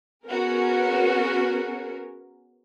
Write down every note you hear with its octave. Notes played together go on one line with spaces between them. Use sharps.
B3 C#4 F#4 G#4 A#4